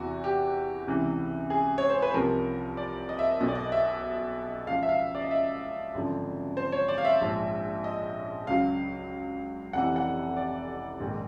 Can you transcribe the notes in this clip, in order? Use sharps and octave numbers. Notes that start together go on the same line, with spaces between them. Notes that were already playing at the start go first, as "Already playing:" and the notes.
Already playing: E2 C3 E3 F#4
G4
C#2 C3 E3
G#4
C#5
C5
B4
C2 C3 F3 A#4
D5
D#5
E5
D#5
B1 B2 F#3 D#5
D5
D#5
E5
C#2 C#3 F3 F5
E5
F5
D5
D#5
E5
G#1 F#2 D3 F3
C5
C#5
D5
F5
E5
A#1 G#2 F3
D#5
C#2 C#3 F#3 F5
F1 F2 C3 E3 F#5
F#5
D5
A#1 G#2 D#3